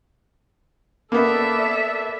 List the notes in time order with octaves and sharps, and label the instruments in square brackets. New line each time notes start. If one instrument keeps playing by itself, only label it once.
[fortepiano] A#3 B3 [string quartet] A4 D5 E5